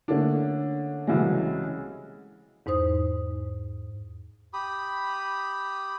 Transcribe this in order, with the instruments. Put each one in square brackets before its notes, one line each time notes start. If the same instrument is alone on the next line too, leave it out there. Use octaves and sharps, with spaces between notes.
[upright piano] D3 A3 A#3 C#4 D4
C2 A2 C#3 E3 F#3 G#3
[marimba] E2 G#2 D#4 C5 D#6
[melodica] G4 B5 D#6